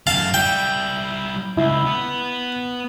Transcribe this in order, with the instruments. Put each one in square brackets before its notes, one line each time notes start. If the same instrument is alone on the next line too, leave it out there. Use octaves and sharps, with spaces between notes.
[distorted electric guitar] F#2 A3 [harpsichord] F5 A5
[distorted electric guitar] G3 E4 [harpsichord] G5
[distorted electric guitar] C#2 [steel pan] E4
[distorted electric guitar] B3